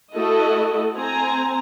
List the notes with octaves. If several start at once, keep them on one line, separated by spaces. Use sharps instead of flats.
A3 E4 F#4 A4 D#5
C4 G#5 A#5